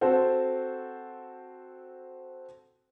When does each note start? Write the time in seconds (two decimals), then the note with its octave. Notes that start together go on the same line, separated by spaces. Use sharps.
0.01 C4 F#4 A4 C5